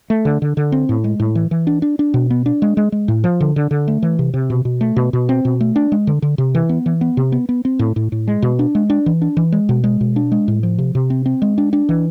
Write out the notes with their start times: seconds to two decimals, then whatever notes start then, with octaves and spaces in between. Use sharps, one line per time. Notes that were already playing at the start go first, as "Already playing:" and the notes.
0.10 A3
0.25 D3
0.42 D3
0.57 D3
0.72 C4
0.89 A2
1.04 G#3
1.20 A2
1.35 E3
1.51 E3
1.67 D4
1.82 D4
1.99 D4
2.14 B2
2.30 B3
2.46 D4
2.62 G#3
2.77 G#3
2.92 G#3
3.08 A2
3.24 F3
3.40 D3
3.56 D3
3.71 D3
3.88 A3
4.02 E3
4.19 C3
4.34 C3
4.50 B2
4.65 B2
4.81 A3
4.96 B2
5.13 B2
5.29 C4
5.45 B2
5.60 A3
5.76 D4
5.92 G#3
6.07 D3
6.22 D3
6.38 C3
6.55 E3
6.69 B3
6.86 E3
7.01 B3
7.17 C3
7.32 B3
7.49 B3
7.65 C4
7.79 A2
7.96 A2
8.12 A2
8.28 G#3
8.42 B2
8.59 D4
8.75 G#3
8.90 D4
9.06 E3
9.22 D4
9.37 E3
9.52 G#3
9.69 B2
9.84 G#3
10.01 B2
10.16 D4
10.32 G#3
10.48 A2
10.63 F3
10.78 C3
10.95 C3
11.10 C4
11.26 C4
11.42 G#3
11.58 D4
11.73 D4
11.89 E3